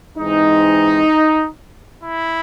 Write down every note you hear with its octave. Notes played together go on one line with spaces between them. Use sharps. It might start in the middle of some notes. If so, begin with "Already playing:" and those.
G#2 E3 G#3 C4 D#4
E4